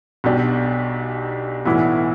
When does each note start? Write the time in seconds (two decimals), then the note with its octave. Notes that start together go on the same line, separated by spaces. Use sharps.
0.24 B1 B2 G3 D4 G4
1.66 B1 A2 E3 B3 E4